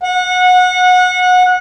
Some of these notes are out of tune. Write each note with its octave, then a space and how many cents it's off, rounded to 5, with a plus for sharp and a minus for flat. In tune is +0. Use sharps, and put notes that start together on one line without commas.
F#5 -25